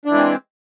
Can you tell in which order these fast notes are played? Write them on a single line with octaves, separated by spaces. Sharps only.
D4 E3 G#3 C4